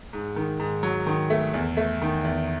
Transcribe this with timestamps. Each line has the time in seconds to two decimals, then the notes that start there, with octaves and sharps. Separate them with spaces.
0.13 G#2
0.36 D#3
0.60 G#2
0.83 F#3
1.07 D#3
1.30 A3
1.54 E2
1.77 A3
2.01 D#3
2.24 E2